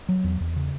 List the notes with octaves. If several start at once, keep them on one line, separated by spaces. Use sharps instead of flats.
F#3
E2
E2
C#3